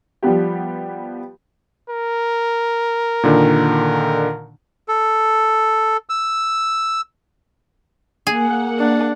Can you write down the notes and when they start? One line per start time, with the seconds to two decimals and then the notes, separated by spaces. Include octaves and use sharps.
0.23 F3 G3 B3 G4
1.90 A#4
3.23 A#2 D3 D#3
4.88 A4
6.09 E6
8.27 A#3 G#4 F#5
8.79 D4